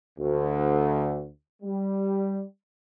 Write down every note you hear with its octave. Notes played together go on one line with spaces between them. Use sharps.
D2
G3